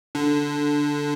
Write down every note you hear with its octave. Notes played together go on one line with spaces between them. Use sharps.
D3